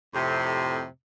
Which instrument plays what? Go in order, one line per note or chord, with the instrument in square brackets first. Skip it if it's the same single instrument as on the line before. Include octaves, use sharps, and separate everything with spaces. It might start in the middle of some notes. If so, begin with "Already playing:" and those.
[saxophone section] F2 A2 C3